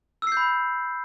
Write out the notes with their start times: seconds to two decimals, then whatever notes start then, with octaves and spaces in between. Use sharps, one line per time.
0.22 E6
0.27 C7
0.32 G6
0.37 B5